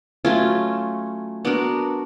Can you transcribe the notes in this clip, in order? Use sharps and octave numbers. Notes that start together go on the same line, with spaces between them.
F#3 A3 C#4 F4
B3 D4 F#4 A#4